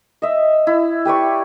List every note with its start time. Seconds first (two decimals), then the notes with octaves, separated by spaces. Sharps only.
0.22 D#5 E5
0.67 E4
1.05 G4 B4 D5 C#6